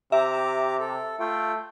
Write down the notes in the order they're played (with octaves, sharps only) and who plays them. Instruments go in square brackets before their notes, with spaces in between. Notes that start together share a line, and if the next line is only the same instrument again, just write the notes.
[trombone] C3 [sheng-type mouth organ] G4 A#5 D6 [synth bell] E5
[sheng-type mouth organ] A4
[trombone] A3 [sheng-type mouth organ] F4 G5